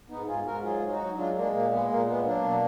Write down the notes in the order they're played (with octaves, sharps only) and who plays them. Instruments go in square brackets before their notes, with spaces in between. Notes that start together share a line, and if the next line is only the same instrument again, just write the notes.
[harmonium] G#2 B3 D#4
G#2 F4 G#4
G#2 F#4 A#4
F#3 F4 G#4
F#3
D#4 F#4
F#3
G#3 D4 F4
G#3 A#3 D4
A#2 A#3
G#3 B3
A#2 A#3
G#3 B3
F#3 A#3 D4
B2